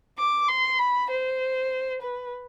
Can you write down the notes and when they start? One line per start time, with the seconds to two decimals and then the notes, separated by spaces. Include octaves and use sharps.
0.18 D6
0.49 C6
0.79 B5
1.10 C5
2.03 B4